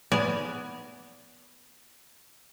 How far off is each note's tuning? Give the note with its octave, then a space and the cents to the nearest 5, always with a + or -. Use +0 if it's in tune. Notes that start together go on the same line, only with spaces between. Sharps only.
B3 +0 D5 -20 G#5 +20